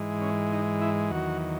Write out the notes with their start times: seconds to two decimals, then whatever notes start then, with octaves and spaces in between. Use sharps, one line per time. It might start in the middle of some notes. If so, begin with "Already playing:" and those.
Already playing: G#2 E3 G#3
0.22 C#4
0.52 D#4
0.82 E4
1.11 E2 D#3 F#3 F#4